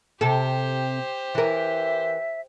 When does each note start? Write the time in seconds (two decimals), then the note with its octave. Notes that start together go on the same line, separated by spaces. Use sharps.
0.21 C3 G4 A4 C5
1.35 E3 A#4 E5